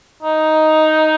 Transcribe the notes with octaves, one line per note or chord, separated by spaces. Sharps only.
D#4